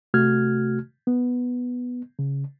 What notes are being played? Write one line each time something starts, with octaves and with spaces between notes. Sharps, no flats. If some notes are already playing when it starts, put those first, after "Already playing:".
C3 A3 F#4 F6 G#6
B3
C#3